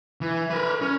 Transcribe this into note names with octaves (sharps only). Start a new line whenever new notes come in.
E3
A#4 B4
C#4